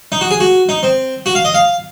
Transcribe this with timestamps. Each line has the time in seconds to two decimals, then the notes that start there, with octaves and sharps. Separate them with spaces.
0.12 D#4
0.21 F#4
0.31 G#4
0.40 F#4
0.69 D#4
0.83 C4
1.26 F#4
1.35 F5
1.45 D#5
1.54 F5